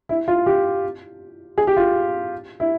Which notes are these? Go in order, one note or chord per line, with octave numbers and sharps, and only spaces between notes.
E4
F4
G4
G#4
G4
F4
E4